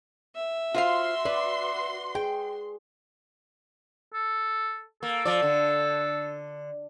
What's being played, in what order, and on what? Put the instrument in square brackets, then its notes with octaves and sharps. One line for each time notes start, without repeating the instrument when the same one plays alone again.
[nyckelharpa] E5
[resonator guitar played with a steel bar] F4 C5 F5 [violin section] F#4 C6
[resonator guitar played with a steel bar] B4 [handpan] D5
[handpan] G#4 [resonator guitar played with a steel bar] G5
[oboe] A4
[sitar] A#3 [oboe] A4
[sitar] F3 D5
D3